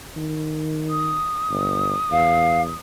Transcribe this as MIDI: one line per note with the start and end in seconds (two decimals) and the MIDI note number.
0.17 1.22 51
0.90 2.76 87
1.50 1.94 31
2.11 2.70 40
2.11 2.61 77